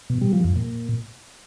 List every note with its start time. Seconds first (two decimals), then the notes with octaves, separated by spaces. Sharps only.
0.10 B2
0.21 G3
0.33 F3
0.44 F2
0.56 A#2